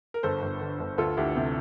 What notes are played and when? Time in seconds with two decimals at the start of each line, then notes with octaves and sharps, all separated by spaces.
0.14 A#4
0.23 G1 A4 C5
0.42 G1
0.61 D3
0.80 G1
0.98 D2 F4 A4
1.17 D2 E4 G4
1.36 C3